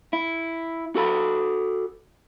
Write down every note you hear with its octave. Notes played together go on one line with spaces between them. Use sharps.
E4
F#4 A4 B5